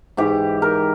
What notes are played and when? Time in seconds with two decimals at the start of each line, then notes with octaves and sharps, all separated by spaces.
0.17 G#2 E3 G4
0.62 A#4